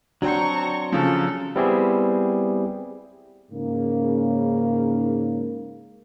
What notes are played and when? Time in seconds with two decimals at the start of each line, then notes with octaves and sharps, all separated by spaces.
0.22 F#3 C4 D4 F#4 G5 A#5 C#6
0.92 C#3 F3 A4
1.56 G3 B3 C4 E4 G4 G#4
3.51 G#2 C#3 A#3